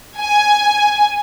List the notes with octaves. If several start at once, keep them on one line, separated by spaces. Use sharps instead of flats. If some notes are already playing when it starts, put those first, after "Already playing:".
G#5